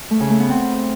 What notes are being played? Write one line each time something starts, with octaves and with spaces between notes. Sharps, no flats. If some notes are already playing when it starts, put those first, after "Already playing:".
A3
C#3
A3
B3
C4